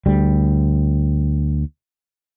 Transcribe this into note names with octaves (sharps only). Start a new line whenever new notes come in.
D2 G3